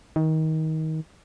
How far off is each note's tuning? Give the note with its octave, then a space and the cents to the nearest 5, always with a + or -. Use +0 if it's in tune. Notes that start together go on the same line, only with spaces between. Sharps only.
D#3 +25